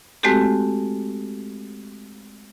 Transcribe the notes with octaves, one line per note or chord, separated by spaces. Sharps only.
G#3 A3 C4 F#4 G4 A4